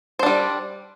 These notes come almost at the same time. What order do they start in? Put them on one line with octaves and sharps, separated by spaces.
C5 D4 G3